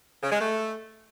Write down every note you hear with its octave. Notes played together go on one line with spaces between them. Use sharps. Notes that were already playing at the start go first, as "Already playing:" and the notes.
C#3
G#3
A3